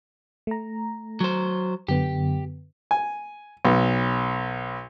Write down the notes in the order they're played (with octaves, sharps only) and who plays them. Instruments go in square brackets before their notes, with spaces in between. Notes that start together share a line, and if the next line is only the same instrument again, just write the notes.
[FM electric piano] A3 A#5
[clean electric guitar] F#3 C5
[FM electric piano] F#2 D3 B3 [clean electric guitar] G4
[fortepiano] G#5
B1